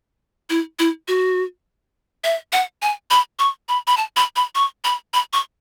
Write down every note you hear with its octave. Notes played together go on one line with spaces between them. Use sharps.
E4
E4
F#4
E5
F#5
G#5
B5
C#6
B5
B5
A5
B5
B5
C#6
B5
B5
C#6